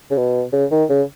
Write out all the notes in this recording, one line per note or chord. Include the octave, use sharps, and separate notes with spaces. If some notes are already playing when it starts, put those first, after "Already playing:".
C#3
B2
C#3
D#3
C#3